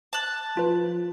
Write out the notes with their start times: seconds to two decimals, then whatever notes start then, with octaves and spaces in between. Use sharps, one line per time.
0.13 A5 F#6
0.57 F3 F4 B4